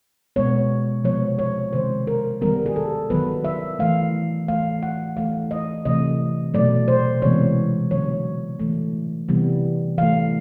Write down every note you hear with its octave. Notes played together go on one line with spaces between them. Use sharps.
B2 G#3 B3 C#5
C3 F3 G#3 B3 C#5
C#5
C3 D#3 G#3 C5
A#4
D#3 G3 B3 A#4
G#4
A4
D#3 F#3 B3 B4
E5
E3 A3 F5
E3 A3 F5
F#5
E3 A3 F5
D#5
C3 E3 A3 D#5
B2 F#3 A3 D5
C5
C3 E3 G#3 B3 C#5
D3 F#3 B3 C#5
E3 A3
C3 E3 G3 B3
E3 A3 F5